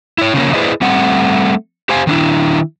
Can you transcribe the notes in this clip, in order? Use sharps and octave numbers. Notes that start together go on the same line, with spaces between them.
E4 C#5
C#3 F3 A#3 C#4
E4 G#4 B4 C5 D5 D#5
G3 A3 C4 F#5
G4 C5 F5 G#5
D#3 D4 E4